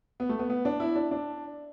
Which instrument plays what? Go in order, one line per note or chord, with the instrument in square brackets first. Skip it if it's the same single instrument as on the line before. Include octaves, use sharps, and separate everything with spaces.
[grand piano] B3
A3
B3
B3
D4
E4
D4
D4